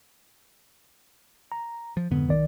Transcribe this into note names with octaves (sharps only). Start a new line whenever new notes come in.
A#5
F3
F2 G#2 D3 B3
B1 D#3 D5